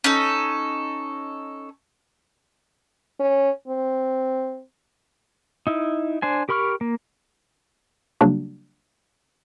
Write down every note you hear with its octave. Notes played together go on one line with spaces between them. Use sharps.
C#4 D#4 A4
C#4
C4
D#4 E4
D4 C5 G#5
G4 A#4 B5 C#6 F6
A#3
C#3 F#3 G3 A#3 D4 F#4